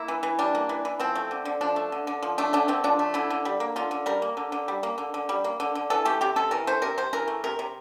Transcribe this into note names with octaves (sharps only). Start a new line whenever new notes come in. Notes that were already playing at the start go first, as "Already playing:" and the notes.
Already playing: A#3 E4
E3
E3
G3 D4
A#3
E3
E3
F3 C4
A3
D3
D3
F3 D4
A3
D3
D3
F3
A3 D4
D3 D4
D3 C4
F3 D4
A3
D3 E4
D3
G3
A#3
D3 F4
D3
G3 A#4
A#3
D3
D3
G3
A#3
D3
D3
G3
A#3
D3
D3
E3 A4
A3 G4
C3 G4
C3 A4
E3 A#4
A3 C5
C3 A#4
C3 C5
E3 A#4
A3
C3 A#4
C3